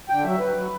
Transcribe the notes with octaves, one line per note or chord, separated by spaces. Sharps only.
D3 G5
F#3 E5
F#3 B4
F#3